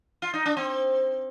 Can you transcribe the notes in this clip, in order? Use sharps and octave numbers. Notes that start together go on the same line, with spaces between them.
F4
D#4
D4
C4